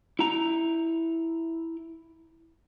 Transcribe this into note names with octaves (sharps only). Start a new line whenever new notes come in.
E4 A#5